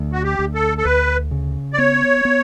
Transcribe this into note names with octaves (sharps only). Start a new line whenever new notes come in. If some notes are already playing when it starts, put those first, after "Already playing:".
Already playing: D2
F#4
G4
D2
A4
A4
D2 B4
C#3
D5
B3 C#5
B3